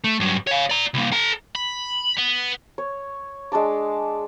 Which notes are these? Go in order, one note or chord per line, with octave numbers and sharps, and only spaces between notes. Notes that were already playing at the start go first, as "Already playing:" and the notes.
A3
G2 F#3
C#5 F5
D5 A#5
C2 A#3
A4 A#5
B5
B3
C#5
G#3 D4 A5 D6